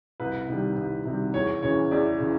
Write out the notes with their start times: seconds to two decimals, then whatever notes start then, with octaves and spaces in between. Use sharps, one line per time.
0.20 C2 B4
0.48 C3 D#3 G3
0.77 C2
1.05 C3 D#3 G3
1.34 E2 C#5
1.62 C#3 E3 C#5
1.91 E2 D5
2.20 C#3 E3